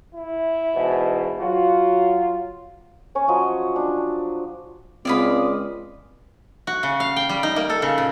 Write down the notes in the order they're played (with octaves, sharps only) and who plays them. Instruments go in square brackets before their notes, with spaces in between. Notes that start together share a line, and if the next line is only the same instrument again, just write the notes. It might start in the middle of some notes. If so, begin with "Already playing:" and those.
[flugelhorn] E4
[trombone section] E2 G#2 B2
[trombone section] F#3 F4 [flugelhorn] F#4
[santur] C#4 C#5 G#5
F3 F#3 D#5
D4
[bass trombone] C#2 [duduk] G#3 [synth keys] C4 D#6 [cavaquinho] D5 F5 B5
[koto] F#4
C#3
F5
G5
G3
D#4
A#3
A4
C#3
A#2